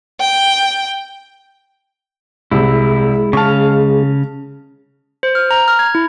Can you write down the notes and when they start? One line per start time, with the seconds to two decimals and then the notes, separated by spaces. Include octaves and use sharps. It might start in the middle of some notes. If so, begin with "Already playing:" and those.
0.20 G5
2.51 C2 C3 G#3 E4
3.33 C#3 F5 A5 C#6
5.23 C5
5.35 F6
5.51 A#5
5.68 F6
5.79 G#6
5.95 E4